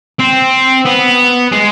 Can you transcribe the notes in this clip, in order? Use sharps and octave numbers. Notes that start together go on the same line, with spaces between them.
C4
B3
G#3